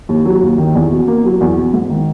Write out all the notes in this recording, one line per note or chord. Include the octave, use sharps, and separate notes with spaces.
D#2
F#3
D#2
D#3
E2
B2
A#3
F#3
E2
B2
G#2
D#3